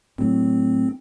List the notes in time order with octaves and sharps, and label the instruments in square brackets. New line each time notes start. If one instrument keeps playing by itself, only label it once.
[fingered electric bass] A2 F#3 [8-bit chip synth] C4